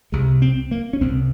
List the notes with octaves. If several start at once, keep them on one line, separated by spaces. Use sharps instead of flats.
C2 C3 G#3
C4
A#3
C#4
C2 C3 C4